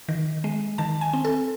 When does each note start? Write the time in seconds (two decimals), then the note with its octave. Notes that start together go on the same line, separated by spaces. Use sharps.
0.09 D#3
0.44 G#3
0.78 D#3 A5
1.01 G#5
1.13 C4
1.25 A4